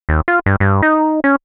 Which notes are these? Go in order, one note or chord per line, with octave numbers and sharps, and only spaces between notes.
D#2
F4
G2
G2
D#4
C#4